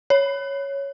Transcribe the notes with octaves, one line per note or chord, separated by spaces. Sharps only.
C#5